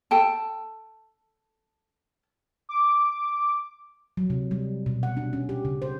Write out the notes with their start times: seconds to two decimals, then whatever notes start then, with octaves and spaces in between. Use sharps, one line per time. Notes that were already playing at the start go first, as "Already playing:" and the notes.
0.11 A4 G5 A5
2.69 D6
4.17 F#3
4.30 C3
4.51 G3
4.86 B2
5.03 F#5
5.17 D4
5.33 C#4
5.49 G4
5.65 C#3
5.82 C5